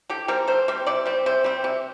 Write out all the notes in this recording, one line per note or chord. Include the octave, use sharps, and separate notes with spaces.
D3 G4
G3 C4 A#4
D3 C5
G3 C4
C3 D5
G3 C4
C3 C5
G3 C4
C3